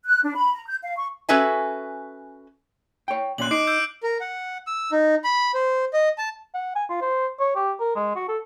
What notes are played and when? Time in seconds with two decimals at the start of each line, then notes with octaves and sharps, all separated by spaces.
0.05 F#6
0.23 D4
0.35 B5
0.54 A#5
0.67 G6
0.82 F5
0.96 C#6
1.29 C#4 F#4 A4 B4 E5 G#5
3.08 C#5 G5
3.38 A#2 C#4 C6 F#6 F#7
3.51 D#4 D6 C7 D7
3.67 E6 G6 D7
4.03 A#4
4.20 F#5
4.67 E6
4.92 D#4
5.24 B5
5.54 C5
5.93 D#5
6.18 A5
6.55 F#5
6.76 G#5
6.90 F4
7.01 C5
7.40 C#5
7.56 G4
7.80 A#4
7.96 G#3
8.16 F#4
8.29 A4